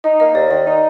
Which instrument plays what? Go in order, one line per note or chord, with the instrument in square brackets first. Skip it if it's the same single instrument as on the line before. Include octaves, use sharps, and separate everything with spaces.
[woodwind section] D#4 [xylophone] D#5
[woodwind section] A#3 [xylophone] D#5
[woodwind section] D#2 [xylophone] D5
[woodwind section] D#3 [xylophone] D5
[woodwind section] D#4